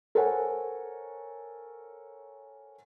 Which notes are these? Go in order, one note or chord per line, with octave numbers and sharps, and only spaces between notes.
A4 A#4 C5 C#5 F#5 G#5